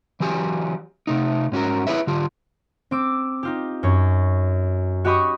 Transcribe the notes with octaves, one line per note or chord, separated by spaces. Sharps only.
E3 F#3 G4 G#5
C3 A3 D#4
G#2 C#4 F#4 A#4
E4 F#4 G#4 B4 C#5 E5
D3 F4 G4
C4 D6 E6
D#4 F4 G4
F#2 C#5
F#4 G4 D#5 B5 C#6 D#6